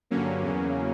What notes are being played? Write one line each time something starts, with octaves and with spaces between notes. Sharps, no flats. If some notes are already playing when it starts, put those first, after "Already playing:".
G2 D3 F#3 A#3 C#4
E2 C#3 F#3